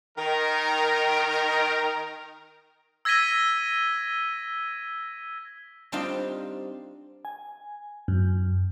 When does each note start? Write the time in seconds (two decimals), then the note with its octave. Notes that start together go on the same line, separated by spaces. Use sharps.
0.18 D#3 A#4
3.05 E6 G#6 A#6 B6 D#7 G7
5.92 G3 C4 D4 D#4 F4
7.25 G#5
8.08 F#2